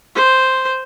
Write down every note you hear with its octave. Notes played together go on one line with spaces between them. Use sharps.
C5